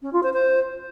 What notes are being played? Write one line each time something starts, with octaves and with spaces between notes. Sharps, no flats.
C#4
F4
C5
C5